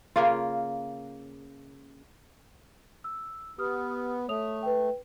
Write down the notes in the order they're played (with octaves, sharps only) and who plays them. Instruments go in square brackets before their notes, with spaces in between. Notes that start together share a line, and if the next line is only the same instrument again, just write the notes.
[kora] C#3 A#3 F4
[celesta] E6
[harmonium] B3 [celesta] G4 D#6 F6
[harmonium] A3 [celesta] C#5 D#6 F7
[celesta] B4 G5